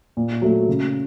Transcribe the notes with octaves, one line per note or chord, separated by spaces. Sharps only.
A#2
F#3 A3
C#3